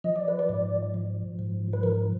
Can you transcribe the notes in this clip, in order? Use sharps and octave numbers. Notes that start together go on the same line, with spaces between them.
F3 D#5
D5
B4
D5
G#2
F3
G#2
B4
F3 A#4